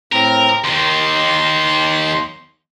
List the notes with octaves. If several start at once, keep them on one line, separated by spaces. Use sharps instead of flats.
A2 C4 A#4
D#2 D#3 C6